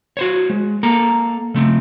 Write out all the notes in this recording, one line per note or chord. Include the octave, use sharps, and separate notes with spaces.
F#4 C5 C#5
G#3
A#3 A4 A#5
C#3 A3 C4